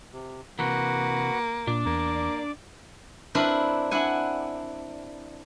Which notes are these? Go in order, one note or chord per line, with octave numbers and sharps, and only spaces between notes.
C3
C3 E3 A#3 F#4 B4 F#5
A#2 D4 D5 D6
E2 A#3
C4 D4 E4 A#4 B4
D4 E4 F#5 G#5